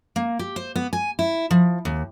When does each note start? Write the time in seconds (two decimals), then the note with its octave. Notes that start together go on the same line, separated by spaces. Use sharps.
0.16 A#3
0.39 G4
0.56 C5
0.76 B3
0.93 G#5
1.19 E4
1.51 F3
1.85 D#2